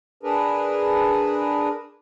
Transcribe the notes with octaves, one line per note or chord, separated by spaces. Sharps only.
D4 G#4 A#4 B4